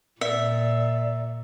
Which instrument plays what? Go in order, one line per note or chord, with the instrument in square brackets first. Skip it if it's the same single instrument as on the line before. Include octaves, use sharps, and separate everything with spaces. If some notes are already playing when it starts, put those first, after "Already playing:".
[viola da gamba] A#2 [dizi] D5 [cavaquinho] E5